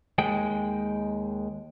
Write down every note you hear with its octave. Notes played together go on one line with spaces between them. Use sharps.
D#2 G#3 G5